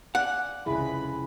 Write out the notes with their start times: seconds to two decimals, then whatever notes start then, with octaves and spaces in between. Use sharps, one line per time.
0.15 D5 F5 F#5 G#5
0.66 F1 C#2 E4 G#4 B4 B5